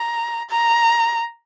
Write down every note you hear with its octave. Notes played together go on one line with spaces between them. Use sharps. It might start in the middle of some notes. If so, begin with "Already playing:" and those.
Already playing: A#5
A#5